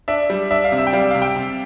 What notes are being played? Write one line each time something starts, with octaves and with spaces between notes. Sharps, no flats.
D4 E5
G3
D4 E5
F5
C3
E5
G5
G3 F5
C3 F5
G5
C3